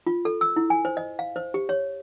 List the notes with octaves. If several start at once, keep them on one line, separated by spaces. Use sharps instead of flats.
F4
A4
E6
E4
G#5
C5
D#5
F5
C5
G4
C#5